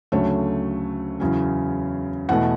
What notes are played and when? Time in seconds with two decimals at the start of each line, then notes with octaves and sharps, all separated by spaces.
0.12 D2 C#3 F#3 A3 C#5
1.20 E2 C#3 F#3 C#4
2.29 E2 B2 A3 F#5